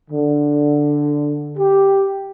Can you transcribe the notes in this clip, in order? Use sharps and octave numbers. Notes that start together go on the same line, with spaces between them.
D3
G4